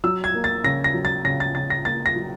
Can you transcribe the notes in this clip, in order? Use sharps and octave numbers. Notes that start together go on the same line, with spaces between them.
F#3 E6
G#6
A#3
A6
C#3 A#6
A#6
F#3
A6
C#3 A#6
A6
C#3 A6
A#6
A#3 A6
A#6
F#3